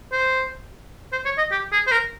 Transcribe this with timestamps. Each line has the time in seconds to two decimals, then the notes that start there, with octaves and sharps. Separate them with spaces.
0.12 C5
1.12 C5
1.25 C#5
1.38 D#5
1.51 G4
1.72 G#4
1.87 C5
1.92 A#4